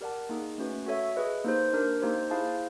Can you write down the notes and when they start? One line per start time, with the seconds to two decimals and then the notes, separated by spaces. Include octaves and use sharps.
0.01 G4 A#4 D5 F#5 A5
0.29 A#3 D#4 G#4
0.58 A3 C#4 F#4 B4
0.86 F#4 A4 C#5 E5
1.16 G#4 B4 D#5
1.45 A#3 D#4 G4 C5
1.73 D4 G4 A#4 D5
2.02 A#3 D#4 G4 C5
2.31 E4 G#4 C5 F5 A5